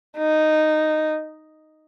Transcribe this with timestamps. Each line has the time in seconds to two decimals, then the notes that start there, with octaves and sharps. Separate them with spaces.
0.18 D#4